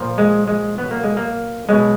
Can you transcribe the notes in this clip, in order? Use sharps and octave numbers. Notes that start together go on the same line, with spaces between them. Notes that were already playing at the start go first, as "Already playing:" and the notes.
Already playing: A#2 F3
G#3
G#3
B2 F#3 B3
A#3
G#3
A#3
B2 F#3 G#3